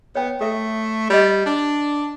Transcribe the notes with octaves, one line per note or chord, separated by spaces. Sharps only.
B3 C#5 G5
A3 A4 E5
G3 D5 D#5
D4